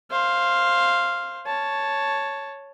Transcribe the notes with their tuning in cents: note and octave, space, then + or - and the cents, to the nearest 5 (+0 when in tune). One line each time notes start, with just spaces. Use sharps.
C5 +15 F5 -5
C#5 +0 A5 +0